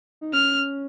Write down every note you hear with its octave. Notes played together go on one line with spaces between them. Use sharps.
D#4
C#4 F6